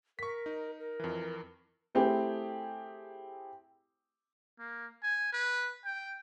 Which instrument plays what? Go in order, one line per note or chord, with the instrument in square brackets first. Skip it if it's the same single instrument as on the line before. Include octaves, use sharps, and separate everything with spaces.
[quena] A#4 [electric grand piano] C#6 B6
[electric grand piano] D#4
[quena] A#4
[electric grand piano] F2 E3
[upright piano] A3 C4 E4 G4 G#4
[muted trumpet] A#3
G#5
B4
G5